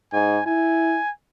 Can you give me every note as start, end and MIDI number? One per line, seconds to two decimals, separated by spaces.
0.13 0.38 44
0.13 0.45 80
0.46 0.97 64
0.46 1.10 80